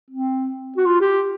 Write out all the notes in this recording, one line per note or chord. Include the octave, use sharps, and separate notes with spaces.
C4
F#4
F4
G4